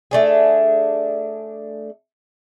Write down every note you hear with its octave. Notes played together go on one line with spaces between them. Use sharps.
A3 D4 G#4